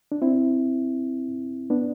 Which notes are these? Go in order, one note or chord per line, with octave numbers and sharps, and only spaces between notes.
D4
C4 E4
B3 D4